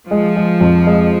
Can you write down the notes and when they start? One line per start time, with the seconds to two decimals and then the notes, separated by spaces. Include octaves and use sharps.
0.10 F3 G#3
0.36 G#3
0.61 F2
0.87 G#3